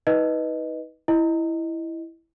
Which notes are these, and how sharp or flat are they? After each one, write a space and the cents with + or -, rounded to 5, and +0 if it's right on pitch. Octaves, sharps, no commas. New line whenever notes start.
D#4 +35 B4 -10 D#5 +0
E4 +0 D#5 +0